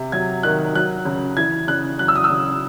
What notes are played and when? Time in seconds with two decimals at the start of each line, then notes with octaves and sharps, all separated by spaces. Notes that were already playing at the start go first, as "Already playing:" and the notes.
Already playing: C3
0.12 F#3 G#6
0.43 D#3 F#6
0.75 F#3 F#6
1.05 C#3
1.37 E3 G#6
1.68 C#3 F#6
1.99 F#3 F#6
2.08 E6
2.16 D#6
2.24 E6
2.30 C#3